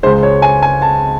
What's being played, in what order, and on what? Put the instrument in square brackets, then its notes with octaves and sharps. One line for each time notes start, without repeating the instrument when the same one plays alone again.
[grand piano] C#2 C#3 G#3 C5
C#5
G#5
G#5
A5